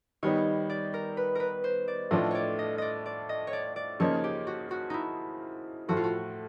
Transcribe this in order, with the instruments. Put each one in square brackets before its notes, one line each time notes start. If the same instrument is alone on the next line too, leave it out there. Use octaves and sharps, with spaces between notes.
[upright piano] D#3 G3 B3 D#4 [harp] C#5
[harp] D5
A#4
B4
A#4 B4
C5
D5
[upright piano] A2 F3 A3 D4 F4 [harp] D#5
[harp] C#5 D5
D#5
D5 D#5
D5
D#5
C#5
D5
D5
[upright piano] C#3 F3 A#3 D#4 [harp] C#5
[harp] G4
F#4
F#4
D#4 E4
[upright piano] A2 F3 A3 [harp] F#4
[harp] F4
F#4